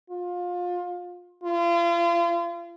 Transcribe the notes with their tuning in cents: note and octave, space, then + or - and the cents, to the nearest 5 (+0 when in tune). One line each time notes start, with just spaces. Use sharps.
F4 +25
F4 -35